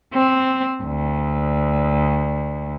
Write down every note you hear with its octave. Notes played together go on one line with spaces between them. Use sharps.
C4
D2